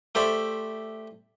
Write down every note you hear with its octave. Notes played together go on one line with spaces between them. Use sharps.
A3 G4 C5 D5 E5